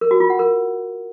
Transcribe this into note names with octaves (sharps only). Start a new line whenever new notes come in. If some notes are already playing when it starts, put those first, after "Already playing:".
A#4
F#4
F4
F#5
A#4